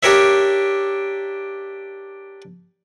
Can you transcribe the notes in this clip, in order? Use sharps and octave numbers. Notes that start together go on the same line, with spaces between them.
D4 G4 A#4 C#5 E5